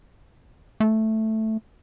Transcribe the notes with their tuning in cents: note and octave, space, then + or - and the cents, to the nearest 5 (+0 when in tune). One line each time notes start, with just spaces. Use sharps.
A3 +0